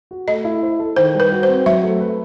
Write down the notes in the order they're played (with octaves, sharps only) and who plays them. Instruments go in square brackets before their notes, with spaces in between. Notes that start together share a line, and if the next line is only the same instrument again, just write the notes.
[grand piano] F#4
[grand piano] A3 [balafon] D#5
[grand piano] E4
C5
A4
[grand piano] D#3 [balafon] C5
[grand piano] G3
[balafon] B4
[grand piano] F#4
[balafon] C5
[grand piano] C4
[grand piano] F#3 [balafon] E5
[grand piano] A3
B4